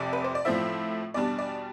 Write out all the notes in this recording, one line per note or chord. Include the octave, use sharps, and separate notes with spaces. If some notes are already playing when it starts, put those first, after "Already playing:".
Already playing: F1 F2 C3 D5
B4
C5
D5
A2 F3 C4 E4 E5
E2 B2 G3 D4 D5
D5